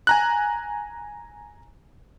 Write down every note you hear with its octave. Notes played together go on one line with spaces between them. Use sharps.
G#5 A#5 F#6